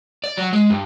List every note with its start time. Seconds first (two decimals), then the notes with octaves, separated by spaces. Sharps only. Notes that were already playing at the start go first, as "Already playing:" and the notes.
0.24 D5
0.37 F#3
0.53 G#3
0.70 G2